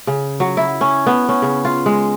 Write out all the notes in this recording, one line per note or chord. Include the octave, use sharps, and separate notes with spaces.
C#3
F#3
E4
C#4
B3
C#4
C#3
F4
G#3